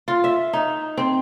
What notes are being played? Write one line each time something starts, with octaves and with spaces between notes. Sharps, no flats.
F4
E5
D#4
C4